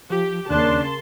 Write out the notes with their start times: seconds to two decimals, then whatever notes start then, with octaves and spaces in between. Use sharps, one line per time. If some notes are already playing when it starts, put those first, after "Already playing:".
0.10 F3 G4
0.50 D#2 C#3 A#3 D4 A5 C6 F#6